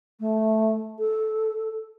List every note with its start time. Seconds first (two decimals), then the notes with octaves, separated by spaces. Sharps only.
0.20 A3
0.99 A4